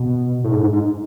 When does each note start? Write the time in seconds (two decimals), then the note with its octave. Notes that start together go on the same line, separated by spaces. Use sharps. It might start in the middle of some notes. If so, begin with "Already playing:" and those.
Already playing: B2
0.44 A2
0.51 G#2
0.62 G#2
0.72 G#2